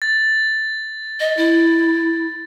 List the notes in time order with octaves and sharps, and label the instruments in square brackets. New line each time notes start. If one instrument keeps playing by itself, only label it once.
[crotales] A6
[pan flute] D#5
E4